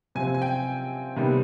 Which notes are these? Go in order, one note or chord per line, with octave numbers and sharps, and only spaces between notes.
C3 F3 C4 G#5
G#5
G5
C3 D#3 G3 B3